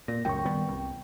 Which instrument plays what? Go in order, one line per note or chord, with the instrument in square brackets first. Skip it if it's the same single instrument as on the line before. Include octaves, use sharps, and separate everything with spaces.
[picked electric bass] A#2 [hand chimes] A#6
[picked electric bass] C#2 F#2 A2 [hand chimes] G5 C#6
[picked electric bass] D#3 G3 B3
C2